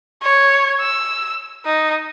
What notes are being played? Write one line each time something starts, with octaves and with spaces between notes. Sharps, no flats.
C#5
E6
D#4